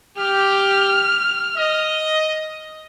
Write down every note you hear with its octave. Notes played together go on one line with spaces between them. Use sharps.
G4 F6
D#5